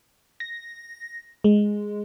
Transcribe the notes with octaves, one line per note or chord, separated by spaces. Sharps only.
A#6
G#3